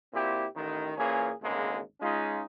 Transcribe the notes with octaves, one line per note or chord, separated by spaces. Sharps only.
A#2 C4 E4 F#4 G4
A1 D#3
A#2 E3 A#3 C#4 G#4
G#1 D2 C#3 G#3 A#3
G#3 C#4 D#4 F4